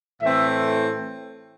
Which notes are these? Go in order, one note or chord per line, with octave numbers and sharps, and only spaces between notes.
A2 E3 A3 C4 E5